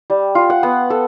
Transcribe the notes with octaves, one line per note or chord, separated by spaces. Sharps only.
G3
F4
F#5
B3
A4